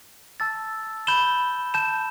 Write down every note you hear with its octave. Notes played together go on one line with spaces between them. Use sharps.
A5 E6 A6
B5 G6 E7 G7
A5 G6 E7